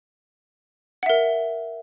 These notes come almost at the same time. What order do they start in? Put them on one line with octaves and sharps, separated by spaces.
F#5 E5 A#4